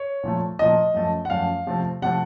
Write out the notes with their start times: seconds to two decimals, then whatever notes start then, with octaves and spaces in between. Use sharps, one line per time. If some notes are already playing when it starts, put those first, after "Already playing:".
Already playing: C#5
0.23 A#2 F3 A3
0.59 A#2 F3 A3 D#5
0.94 F#2 F3 A3
1.25 F#5
1.30 F#2 F3 A3 F5
1.67 C3 F3 A3 C4
2.02 C3 F3 A3 C4 F#5